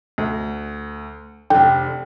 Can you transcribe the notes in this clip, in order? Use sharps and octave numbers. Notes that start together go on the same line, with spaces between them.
D2
F1 D3 G5